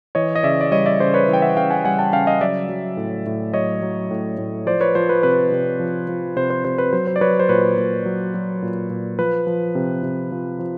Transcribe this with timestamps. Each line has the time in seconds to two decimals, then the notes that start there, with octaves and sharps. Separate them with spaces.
0.15 E3 C#5 D#5
0.36 D#5
0.43 C#3 D5 E5
0.61 D5
0.71 G3 C#5 D#5
0.86 D5 E5
1.00 C#3 C5 D5
1.14 B4 C#5
1.28 E3
1.33 G5
1.42 E5 F#5
1.57 C#3 F5 G5
1.70 F#5 G#5
1.85 G3 F#5 G#5
1.99 G5 A5
2.13 C#3 F5 G5
2.27 D#5 F5
2.41 F#3 D5 E5
2.69 F#3
2.97 A2
3.26 A2
3.53 F#3 C#5 D#5
3.82 F#3
4.11 A2
4.38 A2
4.66 F3 C5 D5
4.81 B4 C#5
4.95 F3 C5
5.09 B4
5.23 C3 B4
5.52 C3
5.80 F3
6.09 F3
6.36 C3 C5
6.50 C5
6.65 C3 C5
6.78 B4
6.93 F#3 C5
7.07 C5
7.16 D5
7.21 F#3 B4 C#5
7.40 C5
7.49 A#2 B4 C#5
7.78 A#2
8.05 F#3
8.34 F#3
8.62 A#2
8.90 A#2
9.19 F3 B4
9.47 F3
9.75 C3
10.03 C3
10.32 F3
10.59 F3